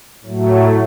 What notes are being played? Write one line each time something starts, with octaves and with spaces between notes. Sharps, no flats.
A2 F#3 A3